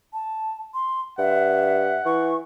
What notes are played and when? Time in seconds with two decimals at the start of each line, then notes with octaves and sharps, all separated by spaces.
0.13 A5
0.74 C6
1.19 G2 E5 F#5
2.06 E3 C#6